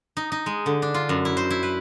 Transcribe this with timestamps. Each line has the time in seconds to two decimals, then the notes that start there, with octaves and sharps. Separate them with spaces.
0.17 D#4
0.32 D#4
0.46 G#3
0.66 D3
0.82 D4
0.94 F4
1.09 F#2
1.25 E4
1.37 C5
1.50 E4
1.63 B4